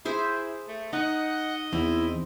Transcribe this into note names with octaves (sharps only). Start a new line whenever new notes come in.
E4 G#4 C5 E5
A3
D#4 D#5 F#5
E2 C4 E4